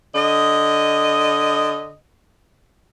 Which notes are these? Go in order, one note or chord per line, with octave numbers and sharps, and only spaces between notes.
D3 D#5